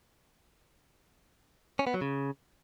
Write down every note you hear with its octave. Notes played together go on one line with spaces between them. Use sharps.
C#4
B3
F#3
C#3